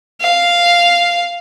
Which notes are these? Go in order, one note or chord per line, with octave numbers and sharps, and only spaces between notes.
F5